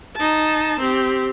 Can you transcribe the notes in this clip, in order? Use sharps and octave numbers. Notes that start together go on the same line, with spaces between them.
D#4 A5
C4 G4